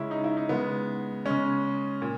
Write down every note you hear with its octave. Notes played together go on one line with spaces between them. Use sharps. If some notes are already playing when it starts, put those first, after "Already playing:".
Already playing: C#3 G#3 C#4 E4
D#4
E4
D#4
C#3 G#3 B3
C#3 G#3 C#4
A#2